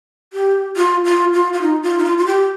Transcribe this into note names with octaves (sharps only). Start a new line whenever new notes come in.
G4
F4
F4
F4
F4
D#4
F4
D#4
F4
F4
G4